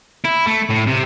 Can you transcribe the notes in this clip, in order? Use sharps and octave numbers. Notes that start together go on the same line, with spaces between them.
E4
A3
A2
C3